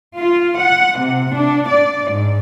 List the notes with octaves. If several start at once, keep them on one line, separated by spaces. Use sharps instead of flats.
F4
F#5
C3
D4
D5
G#2